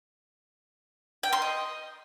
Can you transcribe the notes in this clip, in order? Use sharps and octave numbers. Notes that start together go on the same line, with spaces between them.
G5
C6
D#5